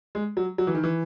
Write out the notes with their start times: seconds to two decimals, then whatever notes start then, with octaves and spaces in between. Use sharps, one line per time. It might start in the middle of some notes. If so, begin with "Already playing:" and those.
0.15 G#3
0.37 F#3
0.58 F#3
0.67 E3
0.75 D#3
0.84 E3